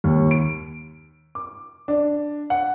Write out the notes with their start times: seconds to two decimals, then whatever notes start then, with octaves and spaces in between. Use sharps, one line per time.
0.04 D#2
0.31 D7
1.35 D6
1.88 D4
2.50 F#5